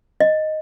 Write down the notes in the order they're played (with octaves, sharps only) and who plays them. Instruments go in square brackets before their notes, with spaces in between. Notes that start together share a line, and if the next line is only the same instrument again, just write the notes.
[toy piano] D#5